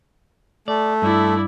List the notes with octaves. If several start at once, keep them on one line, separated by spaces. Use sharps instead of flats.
A3 D5
G2 E4 D5